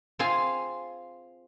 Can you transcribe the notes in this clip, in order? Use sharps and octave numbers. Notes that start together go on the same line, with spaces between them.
C4 F4 G#4 F5 G#5